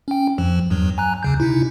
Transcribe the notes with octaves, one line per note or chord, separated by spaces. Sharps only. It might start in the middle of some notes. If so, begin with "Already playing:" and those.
C#4 G5
F2 F3
E2 G2 F#3
G#5 A#5 F#6
D#2 C#3 G6
C3 D#4 E4